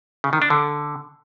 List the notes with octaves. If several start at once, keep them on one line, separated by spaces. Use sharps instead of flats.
C#3
D#3
D4
D3